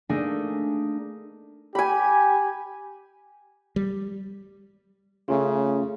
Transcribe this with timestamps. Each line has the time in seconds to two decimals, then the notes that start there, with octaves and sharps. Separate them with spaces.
0.09 A3 A#3 D4 D#4 G#4
1.75 G4 G#5 B5
3.76 G3
5.28 C#3 A3 C#4 F4